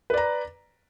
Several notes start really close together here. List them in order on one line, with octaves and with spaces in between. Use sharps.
B4 D5 A#5